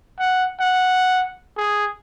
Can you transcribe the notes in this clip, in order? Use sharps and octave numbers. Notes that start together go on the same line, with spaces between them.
F#5
F#5
G#4